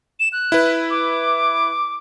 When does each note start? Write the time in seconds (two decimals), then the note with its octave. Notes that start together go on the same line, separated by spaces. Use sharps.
0.20 E7
0.33 F#6
0.52 E4 B4
0.90 D6